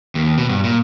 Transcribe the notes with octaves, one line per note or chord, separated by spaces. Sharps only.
D#2
B2
G2
A#2